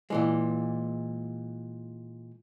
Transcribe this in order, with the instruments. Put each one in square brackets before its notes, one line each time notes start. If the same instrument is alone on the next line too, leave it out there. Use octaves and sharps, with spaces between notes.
[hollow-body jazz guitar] A#2 E3 G#3